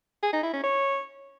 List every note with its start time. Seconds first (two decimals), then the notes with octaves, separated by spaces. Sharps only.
0.23 G#4
0.33 D#4
0.43 E4
0.53 C#4
0.64 C#5